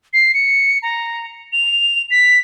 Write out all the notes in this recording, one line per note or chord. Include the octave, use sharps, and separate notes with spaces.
C7
C#7
A#5
F7
B6